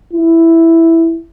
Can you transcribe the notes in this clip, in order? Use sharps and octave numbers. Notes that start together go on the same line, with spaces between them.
E4